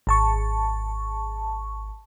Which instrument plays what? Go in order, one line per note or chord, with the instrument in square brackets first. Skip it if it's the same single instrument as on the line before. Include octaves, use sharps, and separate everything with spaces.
[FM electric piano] G#1 A5 C#6